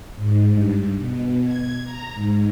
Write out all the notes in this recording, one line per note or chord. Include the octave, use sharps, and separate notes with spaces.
G#2
G2
B2
G#6
A#5
G#2